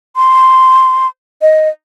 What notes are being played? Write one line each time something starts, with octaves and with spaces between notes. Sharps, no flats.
C6
D#5